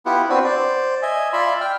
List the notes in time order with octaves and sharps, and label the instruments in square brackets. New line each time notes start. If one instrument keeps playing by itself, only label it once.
[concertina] B3 E4 F4 G4 F#5
C4 D4 F#4 B4 C5
C5 D5
D#5 E5 G#5
F4 D5 E5 B5 C6
G5 F6